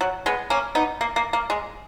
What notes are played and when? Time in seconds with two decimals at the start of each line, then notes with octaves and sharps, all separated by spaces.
0.01 F#3
0.26 G#3 B3
0.50 A#3 C#4
0.75 B3 D#4
1.01 A#3
1.16 A#3
1.33 A#3
1.50 G#3